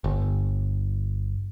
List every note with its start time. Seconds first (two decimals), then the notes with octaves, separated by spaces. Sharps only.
0.04 G1